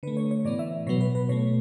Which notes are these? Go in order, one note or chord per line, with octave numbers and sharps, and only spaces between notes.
D3 A3 B4
C#5
C#5
A2 E3 B3 D5
E5
B2 F#3 B3 C#5
B4
B4
B2 A3 C#5